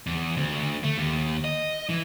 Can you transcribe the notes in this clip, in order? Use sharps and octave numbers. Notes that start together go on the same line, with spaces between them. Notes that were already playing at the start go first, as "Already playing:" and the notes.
E2
D2
A3
D#2
D#5
E3